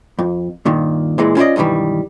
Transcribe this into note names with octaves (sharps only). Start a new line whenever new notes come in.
F2
G2 A#2 D#3
A#2 E3 G#3
C#4 E4 F4 C5 D5 D#5
B1 G2 D#3 E3 G3